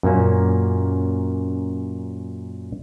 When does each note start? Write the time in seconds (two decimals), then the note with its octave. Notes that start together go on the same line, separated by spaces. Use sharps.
0.03 F#2 A#2 A#3 C#4